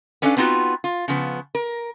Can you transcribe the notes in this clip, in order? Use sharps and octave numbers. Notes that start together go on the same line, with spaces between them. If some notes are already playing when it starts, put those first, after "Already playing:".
B3 C#4 D4 A4 B4 F5
B3 C4 D#4 F4 F#4 B4
F4
C#3 F3 B3
A#4